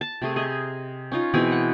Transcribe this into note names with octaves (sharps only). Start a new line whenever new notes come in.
A5
C3 A3 G#4
G#4 D#5
C#4 D#4 F4
B2 E3 C4 G#4
F#5